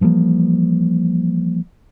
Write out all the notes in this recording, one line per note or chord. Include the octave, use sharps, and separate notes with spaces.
E3 F3 G3 A#3